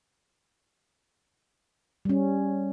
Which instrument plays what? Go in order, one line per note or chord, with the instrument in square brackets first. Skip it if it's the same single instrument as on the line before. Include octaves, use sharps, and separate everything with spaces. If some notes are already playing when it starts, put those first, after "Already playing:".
[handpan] G3 C#4